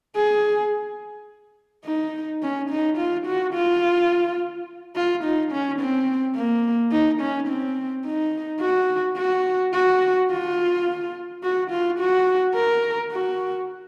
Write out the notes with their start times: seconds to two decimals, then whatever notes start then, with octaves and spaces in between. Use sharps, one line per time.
0.16 G#4
1.85 D#4
2.42 C#4
2.70 D#4
2.97 F4
3.27 F#4
3.54 F4
4.96 F4
5.24 D#4
5.52 C#4
5.79 C4
6.35 A#3
6.92 D#4
7.20 C#4
7.48 C4
8.05 D#4
8.61 F#4
9.17 F#4
9.73 F#4
10.31 F4
11.43 F#4
11.71 F4
12.00 F#4
12.56 A#4
13.11 F#4